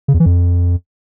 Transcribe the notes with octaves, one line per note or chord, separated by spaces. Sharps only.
C#3
E2
E3
F2